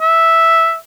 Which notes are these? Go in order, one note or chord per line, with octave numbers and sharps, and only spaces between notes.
E5